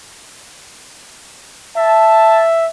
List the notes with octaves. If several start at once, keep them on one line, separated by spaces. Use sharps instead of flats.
E5 A5